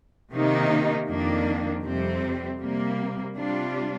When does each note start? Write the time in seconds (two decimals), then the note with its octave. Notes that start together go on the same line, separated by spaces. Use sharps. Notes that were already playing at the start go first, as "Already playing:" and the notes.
0.32 C3 D#3 A#3 D#4
1.08 F2 D#3 A#3 D4
1.84 F2 C3 G3 C4
2.60 C3 G3 A#3
3.37 C3 G3 D4 F4